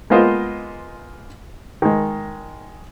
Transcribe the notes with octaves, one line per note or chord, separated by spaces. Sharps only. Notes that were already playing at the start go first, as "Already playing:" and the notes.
G#3 A#3 B3 F4 C5 D#5
D#3 G#3